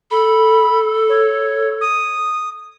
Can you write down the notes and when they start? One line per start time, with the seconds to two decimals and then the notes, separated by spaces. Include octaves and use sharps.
0.11 A4 B5
1.09 C#5
1.81 D#6